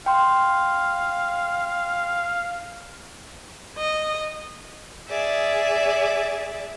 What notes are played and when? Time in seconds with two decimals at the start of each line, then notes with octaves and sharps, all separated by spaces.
0.06 F5 G5 C6
3.78 D#5
5.09 G#4 D5 E5